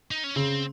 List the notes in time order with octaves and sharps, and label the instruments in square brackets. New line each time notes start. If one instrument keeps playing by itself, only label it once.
[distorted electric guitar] D#4
C#4
[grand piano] C#3 [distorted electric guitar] C4